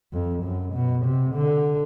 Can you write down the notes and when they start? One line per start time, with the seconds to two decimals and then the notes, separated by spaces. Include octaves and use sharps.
0.13 F2
0.43 F#2
0.74 B2
1.05 C3
1.35 D3